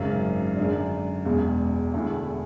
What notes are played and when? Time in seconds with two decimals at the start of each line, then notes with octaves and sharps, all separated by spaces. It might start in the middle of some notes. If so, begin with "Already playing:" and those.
Already playing: G#1 F#2 C#3
0.57 F#2 D3 G#3 D4
1.25 E1 E2 B2 G#3
1.94 E1 E2 D3 A3 E4